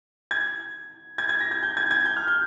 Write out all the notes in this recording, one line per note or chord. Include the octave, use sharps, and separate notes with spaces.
G#6
G#6
G#6
A#6
G#6
G6
G#6
G#6
G6
F6
G6